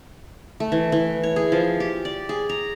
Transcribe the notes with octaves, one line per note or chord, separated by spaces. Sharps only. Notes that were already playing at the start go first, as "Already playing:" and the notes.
A3
E3
E3
C#5
G#4
F3
G4
D5
G#4
A#5